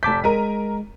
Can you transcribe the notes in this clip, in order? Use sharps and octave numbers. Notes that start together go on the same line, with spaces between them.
F1 A5 D6 G6 B6
G#3 A#4 A#5 D#7